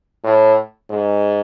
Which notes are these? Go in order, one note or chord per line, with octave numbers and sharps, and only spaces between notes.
A2
G#2